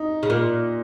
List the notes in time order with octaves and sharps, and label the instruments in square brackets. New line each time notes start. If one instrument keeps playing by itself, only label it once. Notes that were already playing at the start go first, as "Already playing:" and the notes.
Already playing: [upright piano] D#4
[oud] C#3
A#2